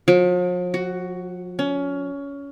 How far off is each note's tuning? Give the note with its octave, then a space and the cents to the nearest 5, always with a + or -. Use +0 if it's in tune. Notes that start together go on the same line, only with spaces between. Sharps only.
F3 +45
F#4 +10
C#4 +20